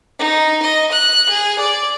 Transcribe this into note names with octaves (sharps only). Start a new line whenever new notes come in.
D#4
D#5
F#6
G#4
D5